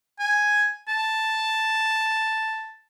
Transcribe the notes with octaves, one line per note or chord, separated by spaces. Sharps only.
G#5
A5